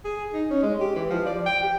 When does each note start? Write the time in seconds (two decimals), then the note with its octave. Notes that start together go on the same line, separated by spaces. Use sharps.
0.05 G#4
0.33 D#4
0.50 C#4
0.63 G#3
0.81 G4
0.96 E3
1.10 F3
1.26 D5
1.46 G5
1.63 G4